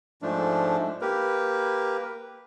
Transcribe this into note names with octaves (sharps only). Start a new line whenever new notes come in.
G#2 F3 A3 D4
A#3 G4 A#4 B4